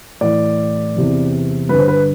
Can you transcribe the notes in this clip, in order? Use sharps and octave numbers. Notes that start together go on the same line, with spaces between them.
A2 E3 D5
E2 C3 E3
G2 D3 B4
C5
B4